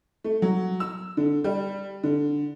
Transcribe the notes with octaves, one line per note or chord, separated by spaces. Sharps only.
A3
F#3
E6
D3
G3
D3